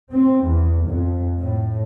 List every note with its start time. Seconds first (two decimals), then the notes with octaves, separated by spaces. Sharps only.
0.11 C4
0.46 E2
0.88 F2
1.39 A2